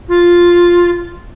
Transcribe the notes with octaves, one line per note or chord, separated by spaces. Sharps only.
F4